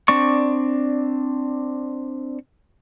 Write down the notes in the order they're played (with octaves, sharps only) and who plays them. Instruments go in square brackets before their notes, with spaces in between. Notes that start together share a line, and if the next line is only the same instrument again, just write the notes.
[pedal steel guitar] C4 D4 D5 C#6